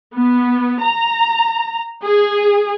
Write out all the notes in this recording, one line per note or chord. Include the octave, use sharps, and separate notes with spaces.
B3
A#5
G#4